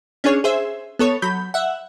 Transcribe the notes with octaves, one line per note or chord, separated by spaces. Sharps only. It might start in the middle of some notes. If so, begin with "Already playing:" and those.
C#4 D4 G#4 C#5
G#4 C5 E5
B3 A4 C#5
F#3 B5 G6
E5 F#5